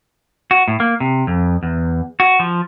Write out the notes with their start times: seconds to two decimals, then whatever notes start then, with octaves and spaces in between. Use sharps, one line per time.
0.51 F#4
0.68 A2
0.80 A#3
1.00 C3
1.27 F2
1.63 E2
2.20 F#4
2.40 F3